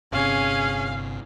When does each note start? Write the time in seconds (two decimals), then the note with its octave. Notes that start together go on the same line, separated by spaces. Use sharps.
0.12 G1 C3 C#4 G#4 F5